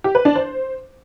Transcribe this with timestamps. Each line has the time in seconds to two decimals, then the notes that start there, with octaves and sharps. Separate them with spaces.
0.04 G4
0.15 B4
0.25 D4
0.36 C5